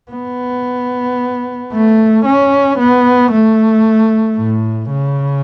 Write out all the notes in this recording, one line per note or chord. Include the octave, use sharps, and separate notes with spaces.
B3
A3
C#4
B3
A3
A2
C#3